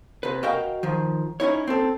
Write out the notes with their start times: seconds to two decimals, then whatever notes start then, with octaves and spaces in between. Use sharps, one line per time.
0.23 C3 B4
0.43 F#4 A#4 D#5 F5 G5
0.83 D#3 F3
1.40 C#4 D#4 E4 C#5
1.67 C4 A4